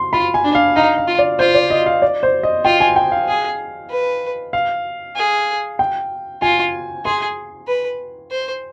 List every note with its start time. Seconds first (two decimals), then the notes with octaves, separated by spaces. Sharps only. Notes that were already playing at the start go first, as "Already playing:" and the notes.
Already playing: C6
0.13 F4 B5
0.34 G#5
0.44 D4
0.55 F5
0.76 D#4 F5
0.98 F5
1.07 F4
1.19 D5
1.39 F4 C5
1.55 D5
1.70 D#5
1.86 F5
2.02 D5
2.23 C5
2.43 D#5
2.65 F4 G5
2.80 G#5
2.96 G5
3.12 F5
3.28 G#4
3.91 B4
4.53 F5
5.16 G#4
5.79 G5
6.42 F4 G#5
7.05 G#4 C6
7.68 B4
8.31 C5